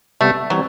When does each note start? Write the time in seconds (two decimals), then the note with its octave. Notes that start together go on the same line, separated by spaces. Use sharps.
0.21 C3 G3 A3 B3
0.50 E3 F#3 G3 C4